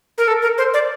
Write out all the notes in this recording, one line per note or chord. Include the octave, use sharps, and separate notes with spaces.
A#4
A4
A#4
C5
D5